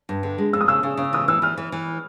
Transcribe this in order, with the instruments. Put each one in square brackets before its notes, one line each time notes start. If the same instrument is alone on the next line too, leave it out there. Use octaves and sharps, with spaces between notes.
[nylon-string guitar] G2
D3
G#3
[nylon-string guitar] F2 [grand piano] E6
[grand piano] D#6
[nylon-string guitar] C#3 [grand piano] E6
[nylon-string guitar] C#3
C#3
[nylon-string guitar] E3 [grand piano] D#6
[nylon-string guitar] E3 [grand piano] E6
[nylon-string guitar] E3 [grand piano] F6
[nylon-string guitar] E3
E3